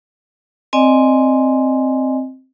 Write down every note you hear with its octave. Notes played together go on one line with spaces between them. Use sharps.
C4 D5 D#5 G#5